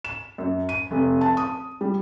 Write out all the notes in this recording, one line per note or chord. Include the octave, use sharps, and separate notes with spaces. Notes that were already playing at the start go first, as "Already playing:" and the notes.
E7
F#2
D#7
F1
A5
D#6
G3